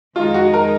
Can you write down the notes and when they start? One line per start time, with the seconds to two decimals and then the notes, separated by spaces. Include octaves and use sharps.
0.15 F2 D#3 G#3 D#4 F4
0.34 F#4
0.54 A#4